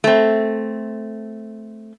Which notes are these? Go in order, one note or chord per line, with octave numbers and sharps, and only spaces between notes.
A3 C4